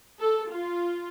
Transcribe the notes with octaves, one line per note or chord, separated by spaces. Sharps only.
A4
F4